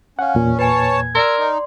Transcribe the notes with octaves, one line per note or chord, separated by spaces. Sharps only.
C#4 F5 F#5
E2 A#2
B4 C#5 G#5 A5
G#6
A#4 D5 C6 E6
D#4